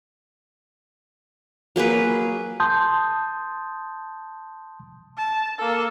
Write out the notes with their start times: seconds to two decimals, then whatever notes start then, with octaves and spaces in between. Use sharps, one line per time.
1.76 F#3 A#3 G#4 B4
2.60 A5 C6 D#6 G6
5.17 A5
5.58 A#3 A4